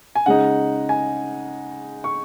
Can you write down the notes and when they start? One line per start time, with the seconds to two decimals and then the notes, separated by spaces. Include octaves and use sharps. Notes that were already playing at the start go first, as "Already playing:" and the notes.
0.15 G#5
0.26 C#3 G#3 D#4 F#5
0.89 G#5
2.04 C#6